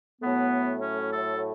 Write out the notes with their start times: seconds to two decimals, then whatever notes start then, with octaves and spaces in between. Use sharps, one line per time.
0.21 A2 F#3 A3 B3
0.82 C#4
1.11 A4